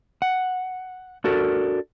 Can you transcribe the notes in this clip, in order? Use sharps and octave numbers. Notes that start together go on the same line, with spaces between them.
F#5
D4 F#4 A4 A#4